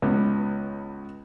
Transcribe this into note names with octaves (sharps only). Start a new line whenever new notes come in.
C#2 B3